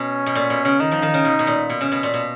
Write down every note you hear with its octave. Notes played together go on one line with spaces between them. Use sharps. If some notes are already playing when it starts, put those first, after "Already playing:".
Already playing: B2 C#4
B2
A#2
B2
C#3
D#3 D#4
F3
D#3
C#3
B2
B2
A#2
B2
C#3
B2
A#2
B2